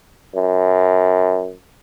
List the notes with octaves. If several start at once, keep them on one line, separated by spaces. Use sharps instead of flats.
F#2